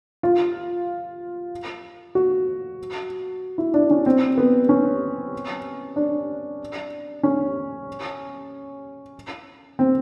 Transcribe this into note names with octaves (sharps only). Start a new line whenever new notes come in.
F4
F#4
E4
D4
C#4
C4
B3
C#4
D4
C#4
C4